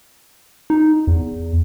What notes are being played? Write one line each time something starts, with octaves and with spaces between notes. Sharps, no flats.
D#4
E2